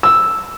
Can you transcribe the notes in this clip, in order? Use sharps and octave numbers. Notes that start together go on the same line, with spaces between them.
E6